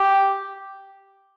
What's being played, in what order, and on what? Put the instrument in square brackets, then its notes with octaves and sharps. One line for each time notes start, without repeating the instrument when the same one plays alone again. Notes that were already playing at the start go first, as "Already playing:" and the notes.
Already playing: [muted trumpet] G4